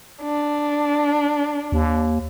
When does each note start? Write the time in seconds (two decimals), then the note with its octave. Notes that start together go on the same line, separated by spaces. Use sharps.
0.22 D4
1.72 D#2